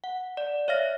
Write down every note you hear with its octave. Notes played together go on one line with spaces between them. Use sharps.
F#5
D5
C#5 E5 F5 F6 A#6